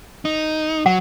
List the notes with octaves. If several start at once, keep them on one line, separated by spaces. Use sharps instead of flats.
D#4
F#3 F#5